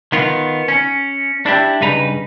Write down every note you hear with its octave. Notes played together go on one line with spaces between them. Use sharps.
D#3 B3 F4
C#4
D4 E4 G4
G2 C#3 D#4 B4 A#5